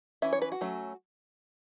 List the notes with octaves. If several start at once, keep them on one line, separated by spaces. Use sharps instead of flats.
E3 C#4 E5
C#5
B4
F#4
F#3 A3 C#4